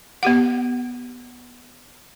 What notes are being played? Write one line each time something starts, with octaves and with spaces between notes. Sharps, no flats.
B3 G4 F#5